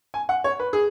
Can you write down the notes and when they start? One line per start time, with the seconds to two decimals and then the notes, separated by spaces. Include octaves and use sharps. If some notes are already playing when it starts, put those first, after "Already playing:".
0.14 G#5
0.29 F#5
0.44 C#5
0.60 B4
0.73 G#4